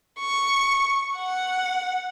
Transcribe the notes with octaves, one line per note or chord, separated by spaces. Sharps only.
C#6
F#5